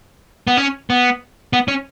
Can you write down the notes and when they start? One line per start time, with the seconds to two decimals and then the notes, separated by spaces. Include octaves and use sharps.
0.47 B3
0.57 C#4
0.90 B3
1.53 B3
1.68 C#4